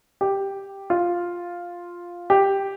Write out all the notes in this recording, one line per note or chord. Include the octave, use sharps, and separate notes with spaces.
G4
F4
G4